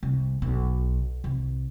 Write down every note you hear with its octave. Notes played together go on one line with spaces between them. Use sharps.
C2
B1
C2